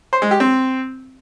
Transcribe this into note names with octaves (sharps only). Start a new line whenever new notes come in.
C5
G#3
G4
C4